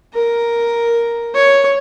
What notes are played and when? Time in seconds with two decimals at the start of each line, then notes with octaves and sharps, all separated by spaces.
0.14 A#4
1.35 C#5